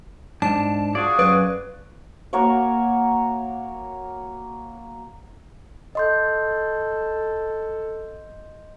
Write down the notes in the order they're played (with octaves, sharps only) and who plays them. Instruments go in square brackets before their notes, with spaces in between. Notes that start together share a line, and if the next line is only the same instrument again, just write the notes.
[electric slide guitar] G#2 D4 [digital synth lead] A5
[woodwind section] F4 F#4 G#4 [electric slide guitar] D5
[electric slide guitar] F#2 D5 [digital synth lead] B4
[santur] A#3 F#4 C#5
[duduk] A4 [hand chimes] D#5 C6 G6